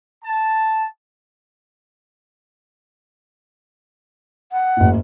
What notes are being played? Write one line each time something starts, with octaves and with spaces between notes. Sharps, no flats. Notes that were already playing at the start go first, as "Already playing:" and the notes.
A5
F#5
F#1 A2